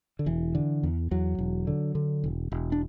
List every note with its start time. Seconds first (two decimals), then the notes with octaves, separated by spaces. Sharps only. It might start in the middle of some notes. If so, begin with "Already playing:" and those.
0.19 D3
0.26 E1 E3
0.55 D3
0.83 E2
1.11 E2 F#3
1.39 E1
1.67 D3
1.95 D3
2.24 E1
2.52 E1
2.72 D4